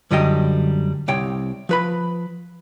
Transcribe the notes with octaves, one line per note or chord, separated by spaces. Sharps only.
F#2 D3 G3 F#4 D#5 G5
C2 C#5 G5
F3 B4 B5